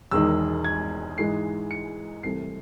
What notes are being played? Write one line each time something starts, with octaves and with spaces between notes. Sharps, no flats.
E1 E2 D#3 G#3 D#4 E6
G#6
G#2 E3 G#3 D#4 C7
C#7
C2 C3 E3 A3 C7